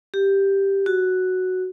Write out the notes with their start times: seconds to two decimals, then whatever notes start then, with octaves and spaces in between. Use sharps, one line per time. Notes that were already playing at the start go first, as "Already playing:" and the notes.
0.14 G4
0.86 F#4